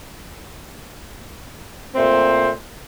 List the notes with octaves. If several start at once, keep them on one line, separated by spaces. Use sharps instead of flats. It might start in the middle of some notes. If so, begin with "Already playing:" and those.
A#2 A3 C4 C5